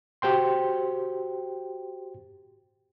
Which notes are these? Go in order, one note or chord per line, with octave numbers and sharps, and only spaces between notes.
F#4 G4 C5 G5 C6